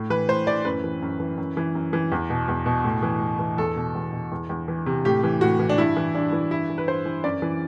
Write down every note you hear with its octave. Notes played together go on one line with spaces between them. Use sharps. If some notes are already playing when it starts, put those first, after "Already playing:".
Already playing: A2
E3 B4
A2 C5
E3 D5
F#2 B4
E3
F#2
E3
F#2
E3
F#2
E3
E2
B2
E2
B2
A2
E3
A2
E3
E2 A4
B2
E2
B2
E2
E2
E3
C3
A2 G4
E3
A2 F#4
E3
D4
G2 E4
E3
G2 D4
E3
G2 E4
E3
B4
G2 C5
E3
F#2 D5
E3